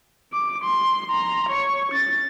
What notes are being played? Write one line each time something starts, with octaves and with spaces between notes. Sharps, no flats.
D6
C6
A#5 C6
C#5 C#6
C#4 A6